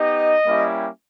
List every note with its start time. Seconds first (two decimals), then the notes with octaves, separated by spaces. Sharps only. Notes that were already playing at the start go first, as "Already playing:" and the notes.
Already playing: B3 D#4 G4 D#5
0.46 G3 A#3 C#4 E4 G4